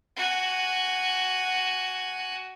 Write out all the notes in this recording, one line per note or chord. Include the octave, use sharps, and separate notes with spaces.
F#4 G#5